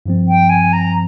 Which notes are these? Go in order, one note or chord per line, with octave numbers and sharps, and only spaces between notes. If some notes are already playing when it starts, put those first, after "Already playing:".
G2 F3 C4
G5
G#5
A#5